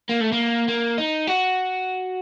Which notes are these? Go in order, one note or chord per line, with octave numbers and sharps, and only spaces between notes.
A#3
A3
A#3
A#3
D#4
F#4